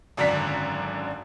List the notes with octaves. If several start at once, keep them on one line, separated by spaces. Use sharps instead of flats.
G#1 F#2 D3 D4 A#5 B6